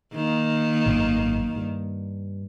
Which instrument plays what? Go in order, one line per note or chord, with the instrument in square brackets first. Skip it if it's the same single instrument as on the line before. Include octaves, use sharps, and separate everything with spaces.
[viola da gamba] D#3 A#3
[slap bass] G#1 F#2 B3
G2